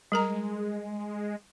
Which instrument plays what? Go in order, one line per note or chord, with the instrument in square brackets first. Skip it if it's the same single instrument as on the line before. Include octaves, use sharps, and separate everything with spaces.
[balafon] G3 A#4 A#5 [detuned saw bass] G#3